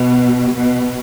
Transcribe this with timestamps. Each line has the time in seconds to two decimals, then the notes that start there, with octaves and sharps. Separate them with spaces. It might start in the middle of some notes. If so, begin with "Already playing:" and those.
Already playing: B2
0.55 B2